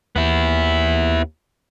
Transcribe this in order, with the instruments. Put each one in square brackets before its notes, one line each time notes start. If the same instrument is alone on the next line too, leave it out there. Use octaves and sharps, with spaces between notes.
[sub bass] D#2 [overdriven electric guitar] B3 E4